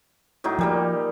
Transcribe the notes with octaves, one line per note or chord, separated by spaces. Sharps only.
A2 F#3 D#4
A#2 F3 G3 A#3